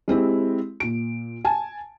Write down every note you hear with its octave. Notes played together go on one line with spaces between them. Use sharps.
G#3 C4 E4 G4
A#2 D7
G#5 A5